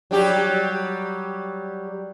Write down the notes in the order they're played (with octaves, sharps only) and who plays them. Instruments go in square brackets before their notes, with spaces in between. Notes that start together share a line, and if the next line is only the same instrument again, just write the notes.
[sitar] F#3 G3 G4